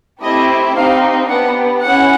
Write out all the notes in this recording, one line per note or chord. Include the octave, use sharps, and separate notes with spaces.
A3 C4 E4 G4 D#5
C4 D#4 G4 F5
B3 D4 G4 F#5
C#4 E4 G#4 F#5